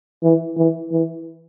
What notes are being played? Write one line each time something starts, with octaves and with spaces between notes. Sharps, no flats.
E3
E3
E3